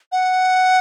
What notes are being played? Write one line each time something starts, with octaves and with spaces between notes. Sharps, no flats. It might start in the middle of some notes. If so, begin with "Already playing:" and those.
F#5